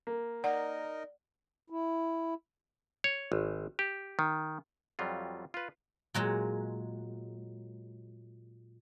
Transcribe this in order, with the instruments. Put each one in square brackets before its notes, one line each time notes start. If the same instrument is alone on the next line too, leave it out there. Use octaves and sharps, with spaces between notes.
[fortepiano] A#3
[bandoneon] D#4 A#4 D#5 [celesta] D5 [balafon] F#5
[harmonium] E4
[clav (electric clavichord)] C#5
G#1
G4
D#3
F2 F#3 G3 F4
F4 B4
[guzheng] A#2 F#3 G#3